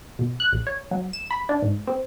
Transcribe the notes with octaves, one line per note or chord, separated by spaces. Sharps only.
B2
F#6
A#1
C#5
F#3
E7
B5
D4
G#2
C4